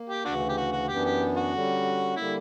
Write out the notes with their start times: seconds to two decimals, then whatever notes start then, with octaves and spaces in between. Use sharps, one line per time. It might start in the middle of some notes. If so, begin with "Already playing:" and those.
Already playing: A#3
0.09 G4
0.25 D2 C#3 E3 D4 F#4
0.49 G4
0.57 F#4
0.72 F#4
0.88 F#2 E3 B3 D4 G4
1.05 G4
1.37 F#4
1.52 D3 G3 C#4
2.16 D3 G3 A#3 E4